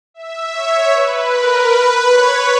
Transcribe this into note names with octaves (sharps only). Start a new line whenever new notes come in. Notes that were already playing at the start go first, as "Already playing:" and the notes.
E5
C#5
B4
A#4
B4
C#5